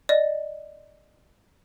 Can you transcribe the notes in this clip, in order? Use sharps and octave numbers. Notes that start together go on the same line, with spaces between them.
D5 D#5